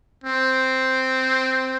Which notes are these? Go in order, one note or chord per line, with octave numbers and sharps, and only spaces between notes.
C4